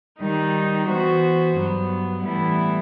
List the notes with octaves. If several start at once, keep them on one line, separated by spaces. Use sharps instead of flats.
D#3 G3 D#4
E3 B3 F#4 C5
G2 F#3 B3
A2 E3 G3 B3 E4